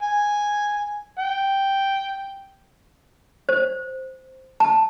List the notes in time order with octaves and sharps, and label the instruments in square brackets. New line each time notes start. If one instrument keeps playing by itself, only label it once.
[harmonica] G#5
G5
[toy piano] C5
A5